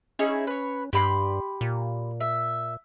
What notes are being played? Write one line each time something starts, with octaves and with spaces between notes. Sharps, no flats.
C#4 D#4 E4 G#4
B4 C#5
G2 G4 B5 C6
A#2
E5